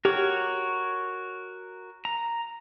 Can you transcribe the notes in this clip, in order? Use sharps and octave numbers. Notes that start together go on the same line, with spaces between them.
F#4 G4 A#4 C#5
A#5